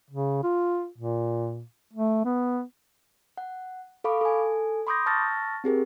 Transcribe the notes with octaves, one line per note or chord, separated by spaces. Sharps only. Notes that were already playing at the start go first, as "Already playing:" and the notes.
C#3
F4
A#2
A3
B3
F#5
A4 F5 B5 C#6 D6
A4 G#5
B5 C6 D6 D#6 G6 A#6
A5 C#6 E6 F6 A6 A#6
C4 G4 G#4 A#4